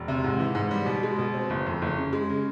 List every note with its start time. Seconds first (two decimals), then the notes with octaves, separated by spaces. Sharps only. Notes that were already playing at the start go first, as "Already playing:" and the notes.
Already playing: E1
0.08 C3
0.24 G#2
0.40 E3
0.55 G#2
0.71 G3
0.86 B2
1.03 G#3
1.19 B2
1.34 C4
1.50 F#1
1.66 F2
1.82 F#1
1.98 C#3
2.13 G#3
2.30 C#3